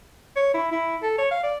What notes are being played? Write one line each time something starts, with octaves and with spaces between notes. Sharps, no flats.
C#5
E4
E4
A4
C#5
F5
D5